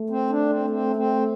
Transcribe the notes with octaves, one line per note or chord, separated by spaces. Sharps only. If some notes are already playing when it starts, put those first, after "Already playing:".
Already playing: A3
C4
D4
C4
C4
C4